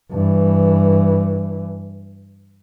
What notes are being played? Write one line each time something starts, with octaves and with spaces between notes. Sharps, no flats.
G2 E3